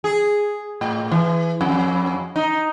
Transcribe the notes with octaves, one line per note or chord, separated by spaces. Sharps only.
G#4
A2
E3
F2
D#4